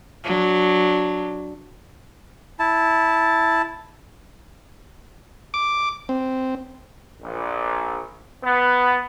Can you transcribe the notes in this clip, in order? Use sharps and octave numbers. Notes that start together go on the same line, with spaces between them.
F#3 D4
E4 A5
D6
C4
A#1
B3